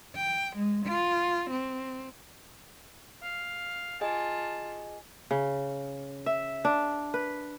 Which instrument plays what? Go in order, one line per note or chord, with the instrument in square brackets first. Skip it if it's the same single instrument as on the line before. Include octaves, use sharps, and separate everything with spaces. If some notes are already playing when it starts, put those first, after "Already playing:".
[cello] G5
G#3
F4
C4
[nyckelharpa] F5
[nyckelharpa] F4 A5 [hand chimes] G#4 D#5 G#5
[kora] C#3
E5
D4
B4